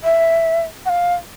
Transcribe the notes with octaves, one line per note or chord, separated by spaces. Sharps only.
E5
F#5
F5